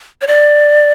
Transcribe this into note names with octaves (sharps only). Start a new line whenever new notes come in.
C#5
D5